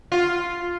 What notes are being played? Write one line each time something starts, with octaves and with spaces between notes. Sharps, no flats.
F4